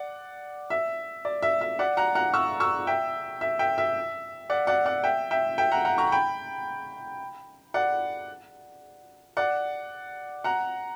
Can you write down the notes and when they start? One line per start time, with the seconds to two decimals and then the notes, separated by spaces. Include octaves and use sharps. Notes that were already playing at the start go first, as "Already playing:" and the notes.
Already playing: D5 F#5
0.70 E5
1.25 D5
1.42 E5
1.61 E5
1.79 D5 F#5
1.97 F#5 A#5
2.15 F#5 A#5
2.33 C#6 E6
2.60 C#6 E6
2.87 E5 G5
3.41 E5
3.59 E5 G5
3.78 E5
4.50 D5 F#5
4.67 D5 F#5
4.86 D5 F#5
5.04 E5 G5
5.31 E5 G5
5.58 E5 G5
5.72 F#5 A#5
5.85 F#5 A#5
5.98 A#5 C#6
6.12 G5 B5
7.74 D5 F#5
9.37 D5 F#5
10.44 F#5 A#5